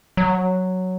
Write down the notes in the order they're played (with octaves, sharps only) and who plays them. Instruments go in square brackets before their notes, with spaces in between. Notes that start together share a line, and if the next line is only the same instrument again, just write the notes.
[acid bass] F#3